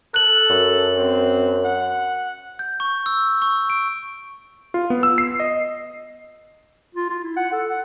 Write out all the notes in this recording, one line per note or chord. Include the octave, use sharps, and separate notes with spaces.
A4 F#6 F#7
F#2
C4
F#5
G6
C#6
E6
C#6
D7
F4
B3
E6
C7
D#5
F4
F4
E4
F#5
A4
F#5